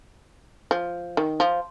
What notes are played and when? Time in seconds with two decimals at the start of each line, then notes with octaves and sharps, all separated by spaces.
0.71 F3
1.17 D#3
1.40 F3